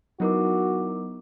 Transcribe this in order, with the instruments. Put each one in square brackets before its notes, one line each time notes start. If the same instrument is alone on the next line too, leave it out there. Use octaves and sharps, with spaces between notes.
[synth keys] F#3 B3 D#4 [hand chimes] E4 A#4 D6 [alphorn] F#4